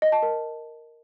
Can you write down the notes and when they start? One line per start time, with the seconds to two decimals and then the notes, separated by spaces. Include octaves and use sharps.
0.02 D#5
0.12 A5
0.22 A#4